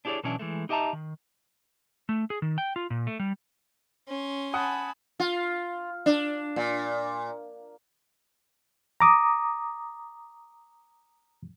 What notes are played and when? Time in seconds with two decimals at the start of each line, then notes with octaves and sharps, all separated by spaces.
0.05 D4 E4 G4 G#4 C#5 D5
0.23 B2 E3 F#3 C#4 D4 E4
0.39 E3 G#3 A3
0.69 D#4 G4 D#5 E5 A5 A#5
0.93 D#3
2.09 A3
2.30 G#4
2.42 D#3
2.58 G5
2.76 F4
2.90 A#2
3.07 A3
3.19 G3
4.08 C#4 C6
4.54 F#5 G#5 A5 B5 D#6
5.20 F4
6.06 D4
6.56 A#2
9.00 A#5 D6 D#6